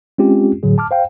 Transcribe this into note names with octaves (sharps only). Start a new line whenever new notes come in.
G#3 C4 C#4 F4 G4
A2 D3 F#3 G#4
A5 D6 F6
C5 F5 G5